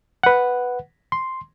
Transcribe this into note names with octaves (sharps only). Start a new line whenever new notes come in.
B4 F#5
C6